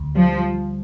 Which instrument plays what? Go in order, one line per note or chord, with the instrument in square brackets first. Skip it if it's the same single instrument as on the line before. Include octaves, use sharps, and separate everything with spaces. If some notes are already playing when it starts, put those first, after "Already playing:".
Already playing: [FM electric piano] D2
[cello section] F3 [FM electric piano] G3